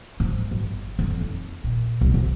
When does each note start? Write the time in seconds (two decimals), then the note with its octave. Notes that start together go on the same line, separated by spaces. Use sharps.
0.20 G#2
0.51 G1
0.99 F2
1.21 D#4
1.64 A#2
2.01 C2
2.14 C3